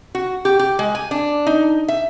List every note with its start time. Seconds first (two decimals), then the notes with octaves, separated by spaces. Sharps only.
0.15 F#4
0.45 G4
0.59 G4
0.79 G#3
0.95 G#5
1.11 D4
1.46 D#4
1.88 E5